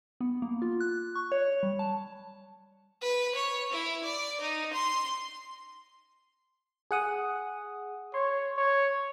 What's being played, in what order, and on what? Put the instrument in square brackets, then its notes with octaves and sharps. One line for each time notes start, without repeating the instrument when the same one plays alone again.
[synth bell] B3
A#3
F4
F#6
C#6
C#5
G3
A5
[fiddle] B4
C#5
E4
D5
D#4
C6
[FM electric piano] G#4 F#5 D#6
[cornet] C#5 [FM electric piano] C6
[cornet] C#5